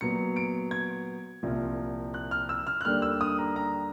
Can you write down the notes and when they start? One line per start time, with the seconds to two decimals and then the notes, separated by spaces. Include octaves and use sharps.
0.01 A#2 F#3 B3 C#7
0.36 D7
0.71 G#6
1.43 C2 A#2 F3
2.14 F#6
2.31 F6
2.49 E6
2.67 F6
2.81 F#6
2.85 D#2 D3 G3 A#3 D4 F6
3.02 E6
3.21 D#6
3.39 A#5
3.56 A#5